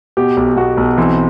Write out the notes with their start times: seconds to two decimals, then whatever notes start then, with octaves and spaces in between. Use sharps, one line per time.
0.17 B2 G4
0.37 B1
0.57 B2 F#4
0.77 B1
0.98 E3 C4